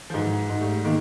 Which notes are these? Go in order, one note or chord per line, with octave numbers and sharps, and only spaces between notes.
F3
G#2 E3 F#3
G#2
G3 A3
D#3 G#3 A#3